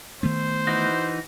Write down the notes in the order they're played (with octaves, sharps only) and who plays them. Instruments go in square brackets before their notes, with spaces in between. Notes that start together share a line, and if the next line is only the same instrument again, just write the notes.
[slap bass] D#3 A3 B3 [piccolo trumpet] C5
[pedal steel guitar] E3 D#4 F#4